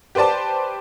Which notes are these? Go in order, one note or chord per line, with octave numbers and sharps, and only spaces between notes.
G4 B4 C5 D5 A5